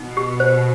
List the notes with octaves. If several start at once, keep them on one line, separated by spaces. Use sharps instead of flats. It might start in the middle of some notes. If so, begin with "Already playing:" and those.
Already playing: B2 D#4
G4
C5